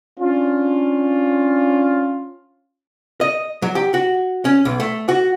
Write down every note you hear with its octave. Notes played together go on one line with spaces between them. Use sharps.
C#4 D4 F4
D#5
F#3
G4
F#4
C#4
B1
A3
F#4